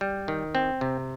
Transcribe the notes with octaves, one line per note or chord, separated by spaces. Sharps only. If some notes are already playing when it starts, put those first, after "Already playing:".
G3
D#3
C4
C3